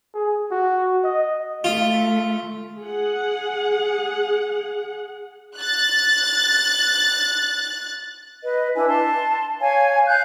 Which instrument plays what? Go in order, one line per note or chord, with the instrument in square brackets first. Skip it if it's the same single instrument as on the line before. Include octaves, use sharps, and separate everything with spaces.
[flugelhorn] G#4
F#4
D#5
[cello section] A3 [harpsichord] F4
[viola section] G#4 F#5
[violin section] F#6 A6
[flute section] B4 D#5
D4 E4 B4 G#5
A5 C6
C#5 F5 G#5
F5 F#6 G6